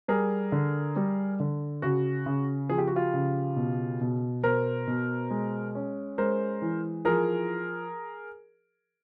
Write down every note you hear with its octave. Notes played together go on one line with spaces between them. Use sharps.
G3 G#4 A#4
D3
G3
D3
C#3 F#4
C#3
F3 G#4
G4
F#4
F4 G4
C#3
B2
B2
B2 A#4 C5
B2
G#3
C#4
G#3 A#4 C5
E3
F3 G#4 A#4